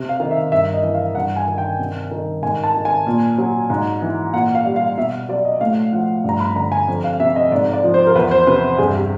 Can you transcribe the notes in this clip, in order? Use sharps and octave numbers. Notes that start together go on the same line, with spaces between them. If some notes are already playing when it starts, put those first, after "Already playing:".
Already playing: C3
F5
D#3
E5
G2 E5
D#5
E3
F5
G2 F#5
G#5
D#3
G5
C3
D#3
G#2 G#5
A5
D#3
G#5
A#2
F#3
G#2
E3
A#2 F#5
F5
G3
F5
B2 E5
F#3 D5
D#5
A2 F5
F3 F#5
G2 A#5
B5
D3 A#5
G#5
F2
F5
C3 E5
D#5
G#2 D5
D5
F3
C5
A#4
E2 B4
C5
C3 B4
G2 G#4
G4